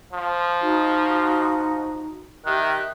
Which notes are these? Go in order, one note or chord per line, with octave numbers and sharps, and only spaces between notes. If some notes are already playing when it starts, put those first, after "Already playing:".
F3
D#4 F#4
D#3 G4 E5 F#6